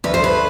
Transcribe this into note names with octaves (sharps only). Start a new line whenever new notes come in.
D2 B4
C5
B4